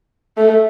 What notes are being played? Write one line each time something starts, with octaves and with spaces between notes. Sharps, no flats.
A3